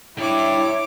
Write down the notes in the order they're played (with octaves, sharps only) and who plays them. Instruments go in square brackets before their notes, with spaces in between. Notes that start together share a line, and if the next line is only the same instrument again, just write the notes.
[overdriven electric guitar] D4 G4 [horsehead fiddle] E4 [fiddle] C#5 D6